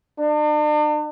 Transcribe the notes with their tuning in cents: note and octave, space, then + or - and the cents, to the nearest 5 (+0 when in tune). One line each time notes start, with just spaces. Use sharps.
D4 +40